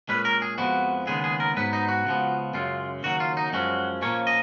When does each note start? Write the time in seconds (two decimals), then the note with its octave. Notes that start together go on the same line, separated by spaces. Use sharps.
0.09 A#2 G#3 C#4 B4
0.25 A#4
0.42 G#4
0.58 F2 F3 G#3 B3 F#4
1.07 D#2 C#3 G#3 B3 G#4
1.24 G#4
1.40 A#4
1.56 G#2 F#3 B3 B4
1.73 D#4
1.88 F#4
2.06 C#2 C#3 F3 B3
2.54 F#2 C#3 G#3 F4
3.03 D#2 C#3 F#3 F#4
3.20 F4
3.37 D#4
3.53 F#2 F3 G#3 C#4 F#4
4.02 A#2 F3 A#3 C#4 C#5
4.27 D#5